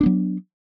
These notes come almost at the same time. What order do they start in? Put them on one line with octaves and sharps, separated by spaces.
D4 B3 F#3